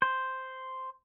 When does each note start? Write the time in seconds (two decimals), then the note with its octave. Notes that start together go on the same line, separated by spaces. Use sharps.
0.02 C5